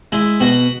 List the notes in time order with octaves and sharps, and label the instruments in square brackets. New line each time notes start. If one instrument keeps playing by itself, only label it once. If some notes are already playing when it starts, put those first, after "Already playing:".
[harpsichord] G#3 E4
B2 F#4